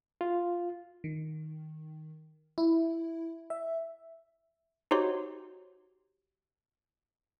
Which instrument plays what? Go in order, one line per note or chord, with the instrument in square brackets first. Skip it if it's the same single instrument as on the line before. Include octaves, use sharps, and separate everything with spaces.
[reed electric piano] F4
[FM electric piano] D#3
E4
E5
[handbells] D#4 F#4 G4 C5 C#5 C6